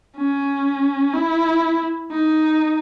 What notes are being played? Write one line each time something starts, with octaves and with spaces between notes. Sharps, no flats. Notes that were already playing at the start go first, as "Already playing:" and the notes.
C#4
E4
D#4